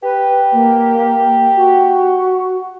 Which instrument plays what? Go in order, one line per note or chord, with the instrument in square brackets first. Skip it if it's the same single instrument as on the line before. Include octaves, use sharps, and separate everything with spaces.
[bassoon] G4 [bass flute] B4
[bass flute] A#3
F#4